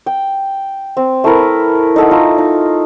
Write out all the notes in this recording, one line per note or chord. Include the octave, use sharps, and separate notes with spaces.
G5
C4
A3 E4 A#4 B4
D#4 A4 F#5
A3 F4 A#5
D#4